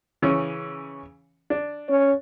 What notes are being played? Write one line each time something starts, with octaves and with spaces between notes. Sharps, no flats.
C#3 E3 C#4
D4
C#4 C#5